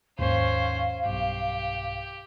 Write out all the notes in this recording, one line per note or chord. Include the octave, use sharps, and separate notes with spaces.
D#2 G#2 C#4 C5 F5
B1 G2 G4